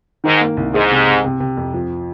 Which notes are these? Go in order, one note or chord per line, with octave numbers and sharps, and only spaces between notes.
G#2 D#3
A#3
C2
G#2 G#4
C3
C3
C3
C3
F2
F3